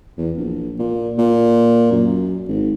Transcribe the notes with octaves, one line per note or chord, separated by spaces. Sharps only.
E2
A#1
A#2
A#2
F#2
G#1